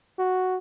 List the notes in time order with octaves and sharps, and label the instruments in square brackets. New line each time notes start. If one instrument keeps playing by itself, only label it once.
[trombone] F#4